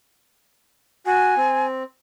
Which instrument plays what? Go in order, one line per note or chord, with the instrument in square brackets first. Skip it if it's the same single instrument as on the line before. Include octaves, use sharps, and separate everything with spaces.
[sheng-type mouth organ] F#4 [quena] G#5
[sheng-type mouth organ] C4